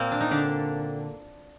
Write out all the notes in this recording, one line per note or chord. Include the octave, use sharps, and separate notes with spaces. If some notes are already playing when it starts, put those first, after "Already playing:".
Already playing: A#2 A#3 C4
D4
D#4
D3 D4